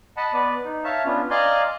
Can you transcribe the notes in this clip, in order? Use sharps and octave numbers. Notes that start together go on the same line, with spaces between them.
D#5 F#5 A5 B5
B3 B4 D5
D#4
C#5 E5 F5 A5
B3 C#4 D4 F4
D5 D#5 F5 G#5 A#5 C6